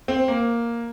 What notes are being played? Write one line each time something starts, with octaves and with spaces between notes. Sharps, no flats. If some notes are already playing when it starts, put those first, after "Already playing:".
C4
A#3